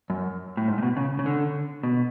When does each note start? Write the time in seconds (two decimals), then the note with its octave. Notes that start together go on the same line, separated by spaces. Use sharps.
0.10 F#2
0.57 A2
0.68 G#2
0.78 A2
0.82 B2
0.97 C#3
1.19 C#3
1.26 D3
1.83 B2